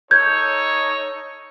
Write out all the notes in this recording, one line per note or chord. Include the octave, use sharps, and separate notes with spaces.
D#4 A4 C#5 G6 G#6